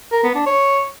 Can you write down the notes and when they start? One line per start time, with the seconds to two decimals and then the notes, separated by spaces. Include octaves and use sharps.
0.12 A#4
0.23 B3
0.35 D4
0.46 C#5